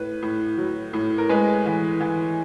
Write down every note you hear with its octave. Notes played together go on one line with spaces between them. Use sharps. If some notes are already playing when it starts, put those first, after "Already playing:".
Already playing: A2 B4
A2
F#3
A2
A#4
G#3 B4
E3
E3